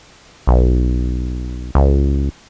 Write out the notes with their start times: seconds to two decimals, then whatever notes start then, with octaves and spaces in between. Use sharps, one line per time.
0.47 B1
1.75 C#2